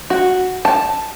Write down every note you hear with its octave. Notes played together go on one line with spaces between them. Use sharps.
F#4
A5